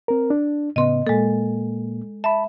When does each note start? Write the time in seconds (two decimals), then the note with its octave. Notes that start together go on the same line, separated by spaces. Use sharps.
0.08 C4 A#4
0.30 D4
0.76 A2 C#3 B3 D#5 C6
1.07 A#2 G#3 A#3 A4
2.24 E5 A5 B5